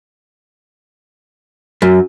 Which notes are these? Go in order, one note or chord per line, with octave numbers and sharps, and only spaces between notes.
F#2